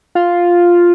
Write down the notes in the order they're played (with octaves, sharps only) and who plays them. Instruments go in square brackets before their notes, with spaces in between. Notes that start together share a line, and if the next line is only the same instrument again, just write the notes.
[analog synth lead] F4